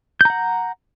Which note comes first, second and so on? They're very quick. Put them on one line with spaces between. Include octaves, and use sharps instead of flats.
G6 A#5 F#5